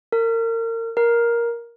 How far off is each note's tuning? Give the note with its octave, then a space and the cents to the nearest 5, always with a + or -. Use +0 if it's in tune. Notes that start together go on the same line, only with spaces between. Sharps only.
A#4 -35
A#4 +10